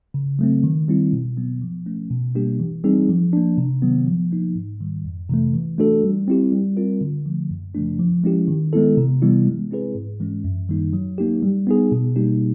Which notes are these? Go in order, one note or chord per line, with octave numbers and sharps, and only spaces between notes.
C#3
F#3 A3 C4
D#3
G3 C4 E4
B2
F#3 B3
F3
A3 C#4
B2
G3 A#3 D4 G4
E3
G3 C4 D#4 G#4
F3
A#3 D4
C3
D#3 F#3 B3
F3
A#3 D#4
G#2
D#3 G3
F2
C3 E3 A3
E3
A3 D4 F#4 A4
G3
C4 E4 G4
G3
C4 F4 A#4
D3
F3 A3
F#2
C#3 F3 A3 D4
F3
G#3 C#4 E4 G4
D#3
G#3 B3 E4 A4
C3
E3 G3 B3 E4
G#3
C4 E4 G#4 B4
G#2
E3 G#3 C#4
F#2
D#3 G3 A#3 D#4
F#3
A#3 D#4 G4
G3
B3 D#4 G#4
B2
G3 A#3 D#4 G4